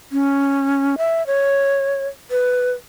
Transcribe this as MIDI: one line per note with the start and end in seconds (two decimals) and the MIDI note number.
0.12 0.96 61
0.98 1.26 76
1.27 2.07 73
2.31 2.72 71